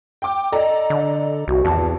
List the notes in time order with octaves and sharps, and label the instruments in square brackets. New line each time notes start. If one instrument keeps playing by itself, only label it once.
[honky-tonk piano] G5 D6
[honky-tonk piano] A4 D5 A#5 [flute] D#5
[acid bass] D3
[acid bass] C2 [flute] F#4
[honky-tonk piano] G#1 [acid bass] E2 [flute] A5